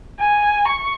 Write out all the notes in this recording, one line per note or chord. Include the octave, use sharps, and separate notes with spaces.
G#5
C#6